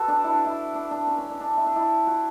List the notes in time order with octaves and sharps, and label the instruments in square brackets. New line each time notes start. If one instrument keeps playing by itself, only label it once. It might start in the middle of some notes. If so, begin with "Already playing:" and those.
Already playing: [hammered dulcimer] F#4 A4 B4
D4
E4
D4
E4
D4
D4
C#4
C#4
D4
D4
E4
D4
E4
F#4